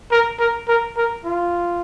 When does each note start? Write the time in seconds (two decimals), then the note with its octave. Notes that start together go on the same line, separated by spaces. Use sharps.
0.11 A#4
0.40 A#4
0.68 A#4
0.97 A#4
1.25 F4